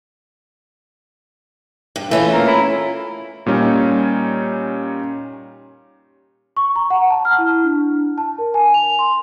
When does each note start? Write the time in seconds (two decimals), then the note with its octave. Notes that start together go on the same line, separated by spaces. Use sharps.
1.96 G2
2.11 E3 A3 C#4 F4
2.32 A#3
2.47 E4
3.46 A#2 G3 C#4 D#4
6.57 C#6
6.76 A#5
6.90 F#5
7.10 A5
7.25 F6
7.38 E4
7.64 D4
8.18 A5
8.38 A#4
8.54 G#5
8.74 F7
8.99 C6